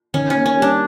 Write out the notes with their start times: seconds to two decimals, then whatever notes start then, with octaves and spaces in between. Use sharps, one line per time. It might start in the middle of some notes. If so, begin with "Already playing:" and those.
0.14 D#3 C#4
0.30 A#3 C#4
0.46 C#4
0.56 G3
0.62 D4